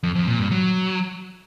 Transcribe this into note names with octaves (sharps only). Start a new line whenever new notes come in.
F2
F2
A#2
G2
F#3